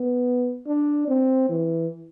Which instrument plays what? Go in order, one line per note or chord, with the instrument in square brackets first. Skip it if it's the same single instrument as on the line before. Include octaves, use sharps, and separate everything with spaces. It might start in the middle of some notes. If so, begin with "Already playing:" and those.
Already playing: [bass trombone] B3
D4
C4
E3